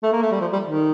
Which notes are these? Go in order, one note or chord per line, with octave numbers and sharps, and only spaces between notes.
A3
A#3
A3
G3
F3
G3
D#3